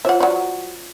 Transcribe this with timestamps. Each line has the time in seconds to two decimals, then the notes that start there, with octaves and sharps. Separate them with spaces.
0.05 F4 C5 C#5 E5 F#5
0.20 F#3 F#4 D5